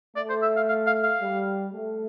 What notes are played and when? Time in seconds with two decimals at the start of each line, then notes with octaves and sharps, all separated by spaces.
0.16 A3 D5
0.29 C5
0.42 E5
0.56 F5
0.69 F5
0.86 F5
1.03 F5
1.21 G3
1.74 A3